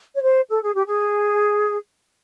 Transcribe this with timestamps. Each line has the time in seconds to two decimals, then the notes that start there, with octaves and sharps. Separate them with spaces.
0.15 C#5
0.21 C5
0.49 A4
0.62 G#4
0.74 G4
0.86 G#4